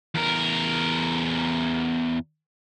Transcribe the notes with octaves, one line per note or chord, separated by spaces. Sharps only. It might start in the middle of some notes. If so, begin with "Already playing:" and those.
E2 A#4